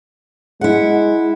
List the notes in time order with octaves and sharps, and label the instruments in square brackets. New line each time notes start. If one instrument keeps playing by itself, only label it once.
[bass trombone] G#3 [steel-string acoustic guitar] E4 F#5